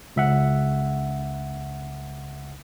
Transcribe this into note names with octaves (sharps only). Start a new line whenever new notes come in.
C#2 E5 F#5